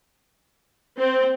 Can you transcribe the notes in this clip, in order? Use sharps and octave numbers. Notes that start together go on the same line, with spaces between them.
C4